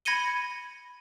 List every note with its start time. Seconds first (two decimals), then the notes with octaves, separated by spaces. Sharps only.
0.05 B5 G#6 A#6 C#7 D#7 G7